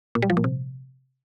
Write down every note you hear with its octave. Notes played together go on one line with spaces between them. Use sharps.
A#2
G3
F3
A#2
C3